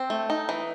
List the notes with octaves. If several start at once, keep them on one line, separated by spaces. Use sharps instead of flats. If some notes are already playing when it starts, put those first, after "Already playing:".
Already playing: C4
A3
D#4
E3